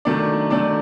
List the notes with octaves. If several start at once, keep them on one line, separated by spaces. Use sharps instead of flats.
D#3 F#3 A3 D4 D5
D#3 F#3 A3 D4 D5